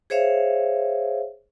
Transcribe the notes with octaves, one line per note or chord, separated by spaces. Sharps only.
G#4 C5 C#5 E5 F5